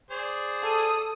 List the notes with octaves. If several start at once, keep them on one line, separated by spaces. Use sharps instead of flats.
G#4 C5 D5
A4 D#6 D#7